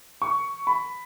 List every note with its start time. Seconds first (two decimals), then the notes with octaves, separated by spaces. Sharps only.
0.22 C#6
0.67 B5